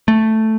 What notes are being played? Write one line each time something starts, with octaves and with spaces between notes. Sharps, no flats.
A3